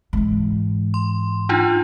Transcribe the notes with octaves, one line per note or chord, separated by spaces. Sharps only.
G#2 E3
C6
D4 D#4 F4